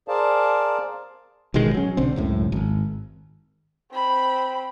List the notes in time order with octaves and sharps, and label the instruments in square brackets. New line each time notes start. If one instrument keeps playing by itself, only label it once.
[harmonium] G#4 A#4 C5 D5 F5 A5
[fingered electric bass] A1 B2 D#3 G#3
F#3 C#4
B1 D3 C4
C#2 F#2 A2
G#1
[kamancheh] C4 B5